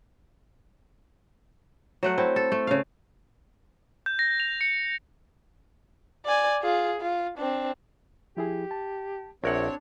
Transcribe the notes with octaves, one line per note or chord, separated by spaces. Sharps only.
F#3 A3 F#5
C4 E4
A4
A3
C#3 F5
G6
A#6
F7
C#7
D5 G#5
F4 G#4
F4
C4 D4
F3 E4 G4 G#4
A5
A#1 C4 D4 A#4 C#5 E5 F#5